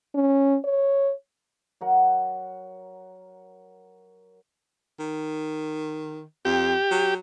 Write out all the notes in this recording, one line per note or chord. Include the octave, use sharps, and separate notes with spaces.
C#4
C#5
F#3 A#4 F#5
D#3
F2 G4
F#3